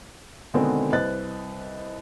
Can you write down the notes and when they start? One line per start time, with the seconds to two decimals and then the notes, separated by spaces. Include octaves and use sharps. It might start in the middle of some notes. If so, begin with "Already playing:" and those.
0.54 B2 D3 D#3 G#3 B3 C4
0.93 C2 B4 C5 D#5 F#6 A6